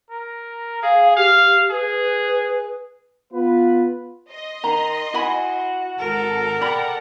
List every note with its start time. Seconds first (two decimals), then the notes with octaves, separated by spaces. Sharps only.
0.10 A#4
0.83 G#4 F5
1.16 G4 F5
1.71 G#4 B4
3.33 B3 F4 B4
4.30 D#5 C6
4.64 D#3 A#5
5.14 E4 F#4 G#5 B5
5.99 G#1 A4 A#4
6.61 A4 D5 F#5 G5 B5